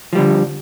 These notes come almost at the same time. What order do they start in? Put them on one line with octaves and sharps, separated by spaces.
F3 G3 D3